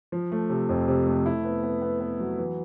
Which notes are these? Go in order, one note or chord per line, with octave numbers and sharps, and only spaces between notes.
F3
A3
C3
F2
C3
A3
E4
B3
B3
B3
B3
F#3
E3